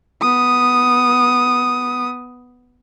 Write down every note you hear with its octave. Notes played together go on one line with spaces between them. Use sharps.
B3 D#6